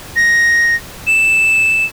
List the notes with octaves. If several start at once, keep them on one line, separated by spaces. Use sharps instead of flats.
A#6
E7